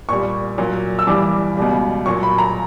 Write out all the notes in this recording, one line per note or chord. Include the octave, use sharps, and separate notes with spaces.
A#2 G3 C#6
A#2 F#3
E6
G2 E3 G3 D6
C#2 B2 G3
A#2 F#3 C#6
B5
A#5